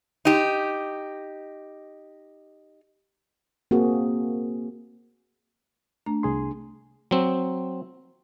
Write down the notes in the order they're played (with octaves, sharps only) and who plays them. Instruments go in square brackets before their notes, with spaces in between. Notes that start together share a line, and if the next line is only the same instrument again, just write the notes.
[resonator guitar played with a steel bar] D#4 G4
[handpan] A#3 C4 F#4 G#4
[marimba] A3 D4 A#5
[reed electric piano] C2 G#4 C6
[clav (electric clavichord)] F#3 C4